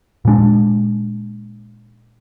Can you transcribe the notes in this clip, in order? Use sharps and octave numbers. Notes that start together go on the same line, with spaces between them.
A#2 G#3 D4